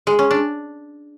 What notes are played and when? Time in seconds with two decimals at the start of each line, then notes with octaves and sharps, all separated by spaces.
0.07 G#3
0.19 C#4
0.31 D4